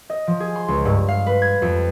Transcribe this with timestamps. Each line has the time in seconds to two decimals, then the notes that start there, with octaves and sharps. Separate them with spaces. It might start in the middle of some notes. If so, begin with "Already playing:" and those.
0.10 D#5
0.27 F3
0.40 G#4
0.56 C6
0.68 C#2
0.85 G2
1.08 F5
1.26 B4
1.42 G#6
1.62 F2